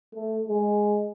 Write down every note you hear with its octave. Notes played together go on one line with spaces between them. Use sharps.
A3
G#3